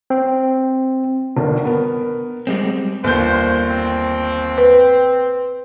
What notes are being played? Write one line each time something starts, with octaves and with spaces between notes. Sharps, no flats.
C4
G1 D3 D#3
B3 A#4
G3 G#3 C4
G1 D#2 C5 G6
C4
B4